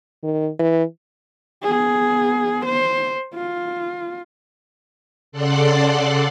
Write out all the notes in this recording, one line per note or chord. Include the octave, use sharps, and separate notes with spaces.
D#3
E3
B3 G#4
C5
F4
C#3 A4 D5 F#5 C6 F#6